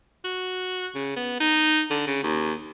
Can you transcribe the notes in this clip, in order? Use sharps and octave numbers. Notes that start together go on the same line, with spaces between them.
F#4
C#3
B3
D#4
D3
C#3
D#2